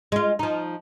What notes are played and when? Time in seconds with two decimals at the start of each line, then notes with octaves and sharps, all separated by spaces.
0.12 G#3 F4
0.39 F3 D#4